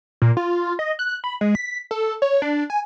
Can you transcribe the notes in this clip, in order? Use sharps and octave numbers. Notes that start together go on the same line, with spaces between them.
A#2
F4
D#5
F#6
B5
G#3
B6
A4
C#5
D4
G#5